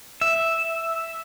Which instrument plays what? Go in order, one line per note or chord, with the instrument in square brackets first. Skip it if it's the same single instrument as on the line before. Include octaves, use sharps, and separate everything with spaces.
[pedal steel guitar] E5